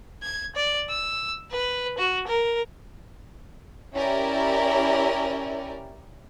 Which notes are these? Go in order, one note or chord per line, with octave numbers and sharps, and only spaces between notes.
G#6
D5
E6
B4
F#4
A#4
C#4 E4 G4 A#4 D5